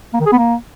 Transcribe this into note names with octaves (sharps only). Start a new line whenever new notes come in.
A#3
D#3
G#4
B3
A#3